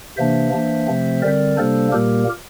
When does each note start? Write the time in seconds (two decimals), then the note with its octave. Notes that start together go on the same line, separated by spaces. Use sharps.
0.17 C3 E3 A#3 D4 C5 E5
0.52 E3 A#3 D4
0.87 C3 F3 A3 C4
1.22 D3 G3 C4 A#4 D5
1.57 C3 G3 A#3 D4 A4 C5
1.92 A#2 G3 A#3 G4 A#4